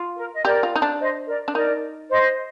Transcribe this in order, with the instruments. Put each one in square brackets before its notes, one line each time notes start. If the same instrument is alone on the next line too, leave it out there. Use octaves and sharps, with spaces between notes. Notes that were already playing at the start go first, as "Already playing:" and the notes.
Already playing: [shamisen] F4
[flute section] A#4
D#5
[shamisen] G4 [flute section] A#4 D5
[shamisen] F4
D#4
D4
[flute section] C5 D#5
A#4 D5
[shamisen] D4
[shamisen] D#4 [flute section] A#4 D5
[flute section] C5 D#5